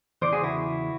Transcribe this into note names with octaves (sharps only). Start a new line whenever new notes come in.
E2 C#3 E3 C5 D5
F#4 G#4
E4 F#4